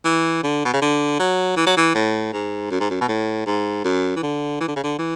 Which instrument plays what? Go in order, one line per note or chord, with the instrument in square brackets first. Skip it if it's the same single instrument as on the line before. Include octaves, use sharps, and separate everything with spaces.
[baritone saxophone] E3
D3
B2
C#3
D3
F#3
E3
F#3
E3
A2
G#2
F#2
G#2
F#2
B2
A2
G#2
F#2
E3
D3
E3
D3
C#3
D3
E3